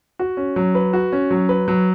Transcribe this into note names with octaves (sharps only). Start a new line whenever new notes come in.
F#4
C#4
F#3
B4
F#4
C#4
F#3
B4
F#3